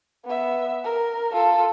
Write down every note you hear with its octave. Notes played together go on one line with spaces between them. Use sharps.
B3 E5
A#4
F4 A4